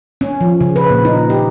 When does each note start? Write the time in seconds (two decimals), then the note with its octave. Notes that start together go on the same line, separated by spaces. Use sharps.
0.21 C#4
0.41 F3
0.61 C#3
0.76 B4
0.90 A#2
1.05 D#4
1.30 G4